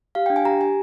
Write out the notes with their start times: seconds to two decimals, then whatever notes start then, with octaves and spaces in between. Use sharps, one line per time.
0.15 G4 F5
0.26 G5
0.30 D4
0.36 G#5
0.45 G4 A#5
0.61 G4 G#5